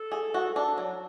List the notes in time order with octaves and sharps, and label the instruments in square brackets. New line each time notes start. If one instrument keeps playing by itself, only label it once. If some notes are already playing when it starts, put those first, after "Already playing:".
Already playing: [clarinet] A4
[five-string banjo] G#4
F#4
D4
F#3